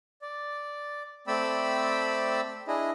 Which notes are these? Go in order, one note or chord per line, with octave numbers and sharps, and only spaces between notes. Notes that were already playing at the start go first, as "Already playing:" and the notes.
D5
A3 C4 D5 G5 B5 E6
D4 E4 G#4 D#5